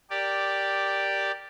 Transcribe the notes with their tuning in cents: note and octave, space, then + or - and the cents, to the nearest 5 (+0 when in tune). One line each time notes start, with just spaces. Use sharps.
G4 +0 A#4 -10 D5 +0